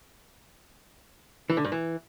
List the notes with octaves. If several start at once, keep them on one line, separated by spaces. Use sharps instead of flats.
E3
D3
G2
E3